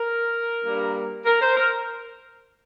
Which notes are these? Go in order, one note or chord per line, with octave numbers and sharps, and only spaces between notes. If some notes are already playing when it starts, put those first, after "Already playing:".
Already playing: A#4
G2 G3 A#3
A#4
C5
A#4